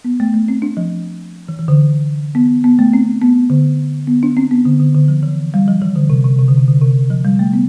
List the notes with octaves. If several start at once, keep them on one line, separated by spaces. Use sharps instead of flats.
B3
A3
A3
C4
D4
F3
E3
E3
D3
B3
B3
A3
C4
B3
D3
B3
D4
C4
B3
D3
D3
D3
F3
E3
G3
F3
E3
D3
C3
C3
C3
D3
C3
D3
C3
F3
G3
A3
B3